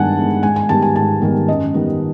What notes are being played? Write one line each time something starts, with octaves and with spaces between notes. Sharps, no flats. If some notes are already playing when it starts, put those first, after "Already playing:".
Already playing: G2 D#3 G#3 B3 F#5 G#5 A5
D#3 G#3 B3
G#2 G#5
G#5
D#3 G3 B3 A5
G#5
G#2 A5
D#3 G3 B3
F#2 D#5
D#3 G3 B3